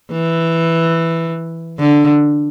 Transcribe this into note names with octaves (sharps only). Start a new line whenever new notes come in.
E3
D3